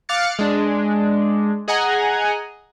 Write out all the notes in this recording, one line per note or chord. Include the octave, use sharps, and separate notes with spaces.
F5 D6 F6 F#6 A6 C#7
G#3 D4
G#4 D#5 F#5 G#5 A#5